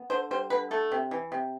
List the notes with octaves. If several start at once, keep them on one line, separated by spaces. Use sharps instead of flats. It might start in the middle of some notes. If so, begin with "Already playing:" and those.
Already playing: B3
D3 C5
G3 C5
D3 B4
A3 A4
C3
E3
C3